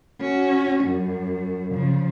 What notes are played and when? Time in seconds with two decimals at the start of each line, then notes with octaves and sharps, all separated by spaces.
0.20 C#4 F#4
0.84 F#2
1.74 C#3 F3